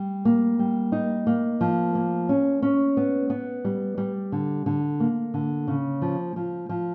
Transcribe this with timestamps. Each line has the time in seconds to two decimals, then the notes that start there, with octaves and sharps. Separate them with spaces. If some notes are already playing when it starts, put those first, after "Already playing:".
Already playing: G3
0.25 A#3
0.59 G3
0.92 D#4
1.27 A#3
1.61 F3
1.95 A#3
2.29 C#4
2.62 C#4
2.97 B3
3.30 B3
3.65 G3
3.98 G3
4.32 D3
4.66 D3
5.00 A#3
5.34 D3
5.68 C#3
6.02 F3
6.36 F3
6.69 F3